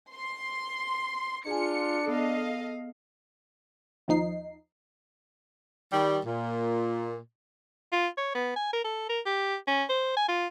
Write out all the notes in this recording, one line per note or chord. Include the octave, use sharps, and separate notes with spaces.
C6
D4 F4 G#4 G#5 C#7
B3 A4 D#5 F5
D#2 F3 D#4 C7
D#3 G3
A#2
F4
C#5
B3
G#5
A#4
A4
A#4
G4
C#4
C5
G#5
F4